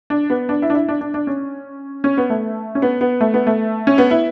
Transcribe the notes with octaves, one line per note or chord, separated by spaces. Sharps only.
D4
B3
D4
E4
D4
E4
D4
D4
D4
C#4
C#4
B3
A3
C#4
B3
B3
A3
B3
A3
C#4
B3
E4